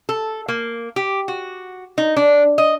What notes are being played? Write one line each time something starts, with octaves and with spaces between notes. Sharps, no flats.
A4
A#3
G4
F#4
D#4
D4
D#5